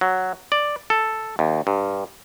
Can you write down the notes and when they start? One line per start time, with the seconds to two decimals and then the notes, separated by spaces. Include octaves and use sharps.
0.01 F#3
0.52 D5
0.90 A4
1.39 D#2
1.67 G2